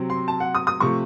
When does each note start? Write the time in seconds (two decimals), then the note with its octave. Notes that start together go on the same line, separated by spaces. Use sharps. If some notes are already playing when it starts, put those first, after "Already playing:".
Already playing: C3 F#3 C4
0.10 C6
0.28 A5
0.40 F#5
0.55 D#6
0.67 D#6
0.80 C3 F3 A3 C#6